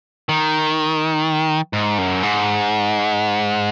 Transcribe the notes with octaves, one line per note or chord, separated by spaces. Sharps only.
D#3
G#2
F#2
G#2